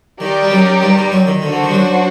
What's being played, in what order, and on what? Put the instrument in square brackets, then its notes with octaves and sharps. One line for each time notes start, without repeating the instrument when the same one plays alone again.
[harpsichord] D#3 [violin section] D#4 G4 A#4 D5
[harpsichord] G3
F#2 F#3
G2 G3
G2 G3
F#2 F#3
D#3
[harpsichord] D3 [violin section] D4 F#4 C5
[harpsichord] D3
D#3
G3
F#2 F#3